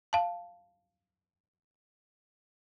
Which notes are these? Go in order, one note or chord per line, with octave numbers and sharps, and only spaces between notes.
F5 A5